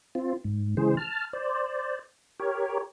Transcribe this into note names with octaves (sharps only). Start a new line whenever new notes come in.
C4 F4
G#2
C#3 E3 G#3 G#4 C5
A5 F6
C5 D5
G4 A#4 C#5